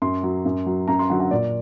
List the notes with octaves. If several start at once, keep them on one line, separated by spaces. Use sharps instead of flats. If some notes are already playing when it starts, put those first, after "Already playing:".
F#2 C6
F#3
F#2
F#3
F#2 A#5
C6
D3 F#3 F#5
F#5
A#2 D5